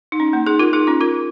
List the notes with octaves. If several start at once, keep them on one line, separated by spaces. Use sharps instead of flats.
D#4
C#4
A#3 D#4
D#4 G#4
F4 A#4
D#4 G#4
C#4 F4
F4 A#4